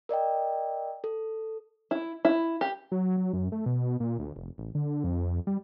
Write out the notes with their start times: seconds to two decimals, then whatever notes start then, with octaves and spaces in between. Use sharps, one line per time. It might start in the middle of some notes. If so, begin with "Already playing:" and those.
0.09 A#4 D5 D#5 G5
1.04 A4
1.91 E4
2.25 E4
2.61 G4
2.92 F#3
3.17 F#3
3.33 F#2
3.52 A3
3.66 B2
4.00 A#2
4.19 D2
4.36 F1
4.58 A1
4.75 D3
5.04 F2
5.47 G3